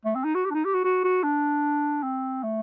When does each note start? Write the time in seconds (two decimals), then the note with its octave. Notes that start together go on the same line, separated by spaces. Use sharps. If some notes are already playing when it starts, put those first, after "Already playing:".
0.05 A3
0.15 C4
0.24 D#4
0.35 F#4
0.45 G4
0.50 D4
0.54 D#4
0.65 G4
0.74 F#4
0.84 F#4
1.04 F#4
1.23 D4
2.03 C4
2.43 A3